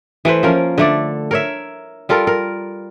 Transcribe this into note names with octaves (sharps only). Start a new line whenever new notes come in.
E3 A3 B4 C5
F3 A#3 C#4 A#4
D3 A3 D5
A#4 C#5 E5
G3 F4 A4 A#4
A#4